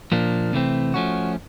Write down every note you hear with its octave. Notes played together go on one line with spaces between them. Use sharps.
A#2 F3 A#3 D4
C3 E3 A3 C4
F3 A3 C#4 F#4